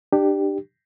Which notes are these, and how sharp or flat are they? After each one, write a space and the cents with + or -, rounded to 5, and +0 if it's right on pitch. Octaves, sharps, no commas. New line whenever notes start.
D4 +25 G4 +0